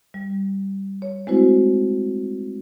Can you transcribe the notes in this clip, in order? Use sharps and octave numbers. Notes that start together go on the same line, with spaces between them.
G3
C#5
G#3 A3 C4 E4 F#4 C5